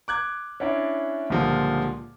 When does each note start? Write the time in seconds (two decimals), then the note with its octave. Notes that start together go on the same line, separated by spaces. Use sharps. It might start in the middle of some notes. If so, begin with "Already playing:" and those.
0.08 D6 F#6 G#6
0.60 C#4 D4 E4 D5
1.30 C#2 A#2 D3 F3 G3